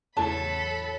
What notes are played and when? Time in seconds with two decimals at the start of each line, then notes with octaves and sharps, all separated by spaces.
0.17 E2 A2 C#3 F#3 A4 A5 B5